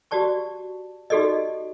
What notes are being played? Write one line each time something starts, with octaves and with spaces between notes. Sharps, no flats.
F#4 G4 D5 A5 C#6
D#4 F#4 G4 A4 D5 D#5